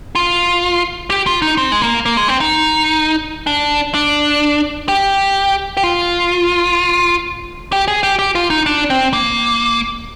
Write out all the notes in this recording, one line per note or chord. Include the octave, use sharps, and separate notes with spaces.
F4
G4
F4
D#4
C4
G#3
A#3
A#3
G#3
C4
D#4
D4
D4
G4
G4
F4
G4
G#4
G4
G4
F4
D#4
D4
C4
A#3